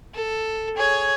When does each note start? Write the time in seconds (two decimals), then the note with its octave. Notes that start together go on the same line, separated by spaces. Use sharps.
0.15 A4
0.77 G#4 C#5